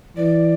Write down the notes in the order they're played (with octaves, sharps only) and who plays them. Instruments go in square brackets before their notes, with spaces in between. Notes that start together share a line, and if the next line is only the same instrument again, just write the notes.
[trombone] E3 [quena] D5